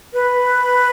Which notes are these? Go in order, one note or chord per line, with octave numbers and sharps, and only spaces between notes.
B4